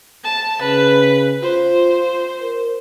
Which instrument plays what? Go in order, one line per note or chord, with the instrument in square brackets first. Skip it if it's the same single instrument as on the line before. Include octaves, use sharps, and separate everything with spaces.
[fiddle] A5
[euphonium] C#3 [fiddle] B4
[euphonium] F4 [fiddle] C5
[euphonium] A#4